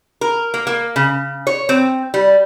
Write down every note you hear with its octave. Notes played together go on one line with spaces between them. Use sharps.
A#4
A#3
A#3
C#3
C#5
C4
G3